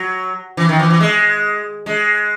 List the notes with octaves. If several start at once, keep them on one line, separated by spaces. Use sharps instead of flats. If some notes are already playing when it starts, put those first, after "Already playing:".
Already playing: F#3
E3
D#3
E3
E3
G#3
G#3